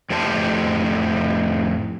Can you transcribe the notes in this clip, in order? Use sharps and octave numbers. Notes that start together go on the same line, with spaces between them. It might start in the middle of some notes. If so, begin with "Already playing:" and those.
F2 A2 G4 C5 A5